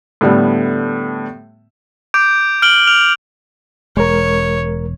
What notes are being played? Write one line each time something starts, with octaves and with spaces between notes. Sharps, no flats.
A2 D3 G3 A3 B3
D6 G6 D7
F6 D7 F#7 G7
F6 F7
E1 G#3 A#4 C#5